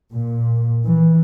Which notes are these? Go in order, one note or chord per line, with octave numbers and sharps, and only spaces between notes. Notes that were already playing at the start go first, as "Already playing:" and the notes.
A#2
E3